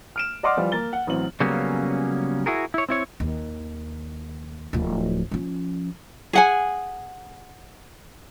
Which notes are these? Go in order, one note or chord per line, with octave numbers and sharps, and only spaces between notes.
F6 D7 E7
D5 D#5 F#5 C6 D6 F6
E3 F3 G3 F4
A#3 A6 G7
F#5
A1 F#3 C4 F#7
C#3 F#3 G3 A#3 B3 C#4
E4 F#4 G#4 A#4
E4 C#5
C4 E4 C#5
D#2
D1 F3
F3 C#4
G#4 F#5 G#5